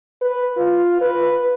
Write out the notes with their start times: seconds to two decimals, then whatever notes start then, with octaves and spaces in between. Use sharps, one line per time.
0.22 B4
0.57 F4
1.01 B4